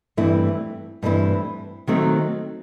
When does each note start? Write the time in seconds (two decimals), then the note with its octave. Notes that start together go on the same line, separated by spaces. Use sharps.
0.17 G2 E3 A3 C4 E4
1.03 G2 E3 A3 C4 E4
1.87 D#3 F#3 A3 C4